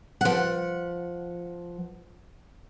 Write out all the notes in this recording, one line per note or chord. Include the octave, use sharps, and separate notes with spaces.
F3 F#5